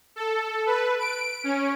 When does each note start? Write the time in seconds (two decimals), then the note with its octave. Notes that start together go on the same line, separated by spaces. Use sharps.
0.16 A4
0.66 B4
0.99 D7
1.44 C#4